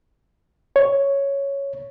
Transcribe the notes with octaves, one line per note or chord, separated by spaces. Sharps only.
C#5